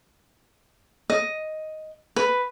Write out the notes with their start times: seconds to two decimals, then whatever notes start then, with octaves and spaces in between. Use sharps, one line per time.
1.10 D#5
2.16 B4